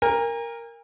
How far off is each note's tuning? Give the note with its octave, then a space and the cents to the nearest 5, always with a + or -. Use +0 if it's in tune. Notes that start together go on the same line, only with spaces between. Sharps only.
A#4 +0 G#5 -45